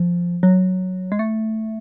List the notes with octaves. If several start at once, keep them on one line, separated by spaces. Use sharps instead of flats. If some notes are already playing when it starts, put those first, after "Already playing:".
Already playing: F3
F#3
G#3
A3